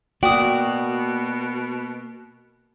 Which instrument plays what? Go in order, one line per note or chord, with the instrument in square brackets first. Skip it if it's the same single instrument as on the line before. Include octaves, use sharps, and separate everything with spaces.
[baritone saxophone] B2 [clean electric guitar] A#3 D5 [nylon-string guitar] F#4 [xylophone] G5 D#6